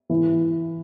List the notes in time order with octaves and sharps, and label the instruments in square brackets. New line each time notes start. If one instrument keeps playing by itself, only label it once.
[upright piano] E3